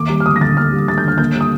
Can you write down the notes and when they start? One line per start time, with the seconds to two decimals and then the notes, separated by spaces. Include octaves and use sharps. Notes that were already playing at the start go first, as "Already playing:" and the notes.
Already playing: D#2 A#3 D6
0.09 G3
0.20 F6
0.26 D2 D#6
0.36 A#6
0.41 D3 A6
0.57 A#3 F6
0.73 G3
0.88 D2 A6
0.98 G6
1.04 D3 F6
1.18 A#3 G6
1.35 G3
1.41 D#6